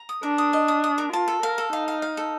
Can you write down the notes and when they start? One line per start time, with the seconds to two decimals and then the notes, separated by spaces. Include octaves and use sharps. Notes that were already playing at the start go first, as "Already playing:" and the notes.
Already playing: A#5
0.09 D#6
0.23 D4 A#4
0.38 D#6
0.53 D#5
0.68 D#6
0.84 D#6
0.98 A#4
1.13 F4 A5
1.28 A4
1.43 A#4 F5
1.58 A4
1.73 D#4 F5
1.88 F5
2.02 F5
2.17 A4